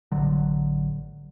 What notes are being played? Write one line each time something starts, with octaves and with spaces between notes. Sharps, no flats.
A1 D3 F#3